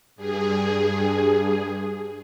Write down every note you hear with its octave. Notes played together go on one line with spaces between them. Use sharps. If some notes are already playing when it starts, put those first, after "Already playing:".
G2 G#4